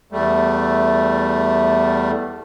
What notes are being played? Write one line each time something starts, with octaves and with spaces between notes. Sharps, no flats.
E2 G3 A3